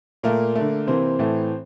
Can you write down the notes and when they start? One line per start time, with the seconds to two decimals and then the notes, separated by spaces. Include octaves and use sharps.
0.23 A#2 A3 A#3 A#4
0.55 D3 A3
0.87 C3 E3 A#3 C4 C5
1.19 A2 E3 A3